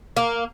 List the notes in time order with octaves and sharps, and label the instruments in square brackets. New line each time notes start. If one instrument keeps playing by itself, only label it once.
[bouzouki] A#3